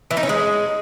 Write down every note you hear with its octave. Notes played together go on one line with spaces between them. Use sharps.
E3
D#4
C#4
G#3